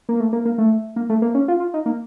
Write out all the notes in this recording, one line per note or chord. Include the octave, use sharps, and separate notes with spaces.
A#3
A3
A#3
A#3
A3
A#3
A3
A#3
C#4
F4
F4
D#4
A#3